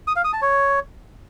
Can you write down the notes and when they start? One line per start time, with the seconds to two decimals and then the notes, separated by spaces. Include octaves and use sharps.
0.07 D#6
0.16 F5
0.24 D#6
0.33 A5
0.42 C#5